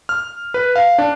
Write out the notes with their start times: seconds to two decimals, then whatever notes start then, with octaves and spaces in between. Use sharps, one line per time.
0.09 F6
0.54 B4
0.76 F5
0.98 D4